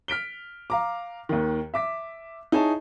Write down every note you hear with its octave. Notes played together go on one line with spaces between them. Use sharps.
F6 B6 D7 G7
F5 A#5 D6
D#2 D#3
E5 D6 B6
D#4 E4 G#4 C#5 A5